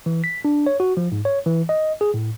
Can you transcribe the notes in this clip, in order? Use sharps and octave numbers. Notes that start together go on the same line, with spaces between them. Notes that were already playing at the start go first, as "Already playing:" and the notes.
E3
B6
D4
C#5
F#4
F3
G#2
C#5
E3
D#5
G#4
A2